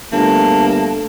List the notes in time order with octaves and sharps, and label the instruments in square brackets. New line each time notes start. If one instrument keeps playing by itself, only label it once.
[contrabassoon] G1 [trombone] A3 [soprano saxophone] A#3 [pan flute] A5